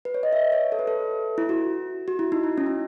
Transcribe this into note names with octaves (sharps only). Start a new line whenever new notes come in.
B4
C#5
D#5
E5
C#5
A4
B4
A4
E4
F#4
F#4
E4
D#4
E4
C#4
D#4